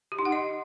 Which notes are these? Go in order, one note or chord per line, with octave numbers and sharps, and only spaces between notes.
G4
D#4
F#5
D#5